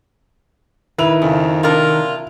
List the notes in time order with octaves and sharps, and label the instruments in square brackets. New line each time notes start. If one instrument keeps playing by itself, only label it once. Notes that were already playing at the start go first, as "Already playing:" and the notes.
[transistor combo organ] D#3 [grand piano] E4 F7 [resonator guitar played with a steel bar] B4
[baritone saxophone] F2 [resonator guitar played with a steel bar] C#3
[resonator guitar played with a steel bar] C3 D4 A#4 [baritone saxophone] F4